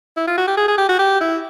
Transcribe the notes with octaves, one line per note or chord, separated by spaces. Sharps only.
E4
F4
F#4
G4
G#4
G#4
G4
F#4
G4
E4